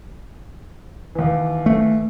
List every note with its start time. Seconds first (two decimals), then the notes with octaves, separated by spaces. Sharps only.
1.15 D#2 E3
1.66 A3